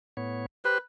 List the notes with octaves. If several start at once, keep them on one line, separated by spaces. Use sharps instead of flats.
A2 B3 C#5
G4 B4 C5